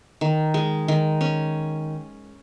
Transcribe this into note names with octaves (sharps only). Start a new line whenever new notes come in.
D#3
G#3
D#3
C#4